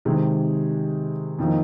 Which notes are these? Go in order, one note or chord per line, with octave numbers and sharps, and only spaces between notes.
C3 D#3 G#3
F2 D#3 A#3 D#4